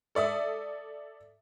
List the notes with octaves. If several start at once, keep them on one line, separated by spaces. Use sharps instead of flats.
A4 D5 E5 D#6